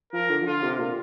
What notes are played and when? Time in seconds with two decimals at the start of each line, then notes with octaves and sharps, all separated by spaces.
0.13 F3 A#4
0.30 D3
0.42 F3
0.46 D3 F4
0.62 C3
0.79 A#2